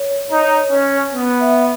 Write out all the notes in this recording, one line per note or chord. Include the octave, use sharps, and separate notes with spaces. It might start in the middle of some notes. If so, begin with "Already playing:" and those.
Already playing: C#5
D#4
C#4
B3
E5